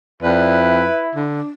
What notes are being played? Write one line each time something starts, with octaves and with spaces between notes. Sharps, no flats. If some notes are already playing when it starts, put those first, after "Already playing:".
F2 E4 B4 D5
E5
D3 D4